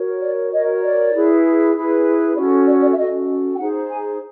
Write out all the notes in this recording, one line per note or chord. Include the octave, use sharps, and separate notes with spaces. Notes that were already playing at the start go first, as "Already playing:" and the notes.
Already playing: F#4 A#4 C#5
D5
F#4 A#4 C#5 D#5
D5
E4 G#4 B4
E4 G#4 B4
C#4 F#4 A4 D5
D5
D5
E5
C#4 F#4 A4 D#5
G5
D#4 G#4 C5 F#5
G#5